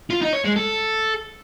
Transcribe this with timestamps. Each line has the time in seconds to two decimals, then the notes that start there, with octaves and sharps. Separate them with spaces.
0.10 F4
0.21 D#4
0.33 C#5
0.45 G#3
0.56 A4